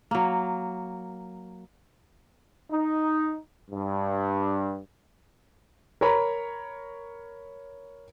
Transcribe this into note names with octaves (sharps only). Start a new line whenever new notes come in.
F#3 A#3
D#4
G2
A#4 C#5 A#5 B5